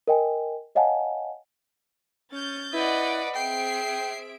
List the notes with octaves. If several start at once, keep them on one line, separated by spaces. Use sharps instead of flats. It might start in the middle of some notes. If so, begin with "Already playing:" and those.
A#4 D#5 G5 G#5
C#5 D#5 F5 F#5 G#5 A5
C#4 G6 A6
E4 B4 D5 D#5 F#5
C4 G#4 E5 G5 C7 D7